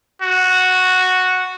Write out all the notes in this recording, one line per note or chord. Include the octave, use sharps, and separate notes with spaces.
F#4